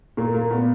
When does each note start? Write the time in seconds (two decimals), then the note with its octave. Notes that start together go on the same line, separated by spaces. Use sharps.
0.17 A#2 A#3
0.34 A#3
0.51 A#2 B3